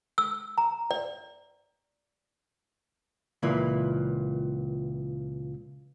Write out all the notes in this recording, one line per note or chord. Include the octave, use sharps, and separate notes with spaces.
E6
A#5
D5
C#2 A#2 E3